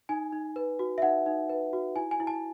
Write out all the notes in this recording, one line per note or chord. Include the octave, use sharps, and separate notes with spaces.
D#4 G#5
D#4
B4
F#4
E5
D#4 F#5
D#4
B4
F#4
E4 G#5
G#5
E4
A5